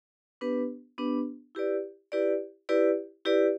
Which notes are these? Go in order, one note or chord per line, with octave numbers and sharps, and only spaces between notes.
B3 D4 G4 B4
B3 D4 G4 B4
E4 G4 B4 D5
E4 G4 B4 D5
E4 G4 B4 D5
E4 G4 B4 D5